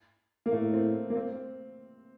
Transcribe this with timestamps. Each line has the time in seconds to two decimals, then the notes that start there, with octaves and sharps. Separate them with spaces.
0.46 A#3
0.52 A2 A3
0.74 C4
1.10 A#3
1.15 C4